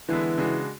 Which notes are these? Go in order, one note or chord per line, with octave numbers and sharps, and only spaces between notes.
D3 E3 G#3 B3 E4
C#3 G#3 D4 F#4